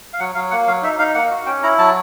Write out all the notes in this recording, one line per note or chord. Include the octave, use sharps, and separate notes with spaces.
F5
F#3 F#5
F#3 F5
A#3 F#5
F#3 F5
D#4 E5
D#4 F5
A#3 F#5
F#4
C#4 G5
E4 A#5
F#3 A5